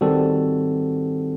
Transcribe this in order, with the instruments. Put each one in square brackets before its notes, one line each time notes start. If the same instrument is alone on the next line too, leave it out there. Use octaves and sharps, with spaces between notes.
[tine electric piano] D#3 G3 C4 F#4 A4